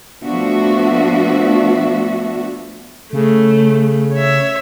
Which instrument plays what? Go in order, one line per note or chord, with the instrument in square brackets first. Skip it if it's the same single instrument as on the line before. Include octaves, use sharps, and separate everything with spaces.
[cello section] F3 A3 B3 D4 F#4 E5
[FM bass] C#3 [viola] A3
[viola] C#5 E5